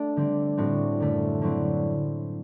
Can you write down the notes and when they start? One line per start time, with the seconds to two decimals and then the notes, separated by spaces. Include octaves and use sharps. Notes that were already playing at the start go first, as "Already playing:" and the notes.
Already playing: A3 D4
0.16 D3 G3 C4
0.57 A2 G3 C4 F#4
1.00 F#2 D3 A3
1.42 D3 F#3 C4 E4